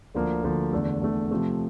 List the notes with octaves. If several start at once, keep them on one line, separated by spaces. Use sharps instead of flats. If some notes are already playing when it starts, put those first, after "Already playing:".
D2 D3 F3 A#3
D2 D3 F3 A#3
E2 D3 A3
E2 D3 A3
C3 F3 A3